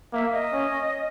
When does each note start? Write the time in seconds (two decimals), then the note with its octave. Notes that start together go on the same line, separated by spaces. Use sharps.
0.13 A#3 E5
0.32 D#5
0.53 C#4